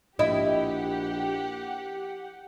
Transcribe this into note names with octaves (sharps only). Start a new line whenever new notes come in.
A#1 E4 G4 D#5 F#5